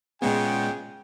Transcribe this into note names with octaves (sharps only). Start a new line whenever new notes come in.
A#2 C#3 G#3 B3 G5